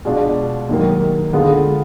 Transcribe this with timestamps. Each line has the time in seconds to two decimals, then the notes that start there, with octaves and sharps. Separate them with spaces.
0.05 B2 G#3 D4 F4
0.69 D#2 D#3 F#3 A#3
1.33 D3 G#3 B3 F4